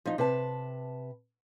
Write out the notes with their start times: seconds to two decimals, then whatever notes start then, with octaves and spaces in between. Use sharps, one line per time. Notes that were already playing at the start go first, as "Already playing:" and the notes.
0.05 F3 D#4
0.18 C3 B4 A5